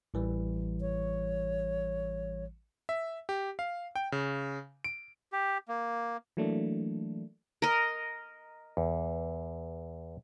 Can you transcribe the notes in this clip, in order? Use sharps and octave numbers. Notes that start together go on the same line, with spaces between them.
A1 E3 G3
C#5
E5
G4
F5
G5
C#3
D7
G4
A#3
E3 F#3 A3 A#3 D4
A#4 D#5
E2